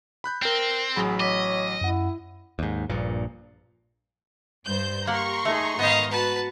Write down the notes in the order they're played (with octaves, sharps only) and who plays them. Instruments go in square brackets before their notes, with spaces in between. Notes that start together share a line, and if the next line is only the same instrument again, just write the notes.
[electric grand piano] B5 F#6 G6
[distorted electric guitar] C4 [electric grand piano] A#4 G5
[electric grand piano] A1 F#3 B5 [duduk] G#4
[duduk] C#5 [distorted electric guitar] D#5 [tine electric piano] D6 B6
[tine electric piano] F#2 F#5 [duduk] E4
[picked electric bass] D#2 G#2
A#1 G2 A#2
[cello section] G2 [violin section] C5 G6
[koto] A#3 F#5 [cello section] G4 [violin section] A#5 C6 C#6
[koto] A3 [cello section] D#4 G#4
[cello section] G#2 D#3 [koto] B3 D#4 [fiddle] D#5 F5
[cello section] F#4 [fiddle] B4 A5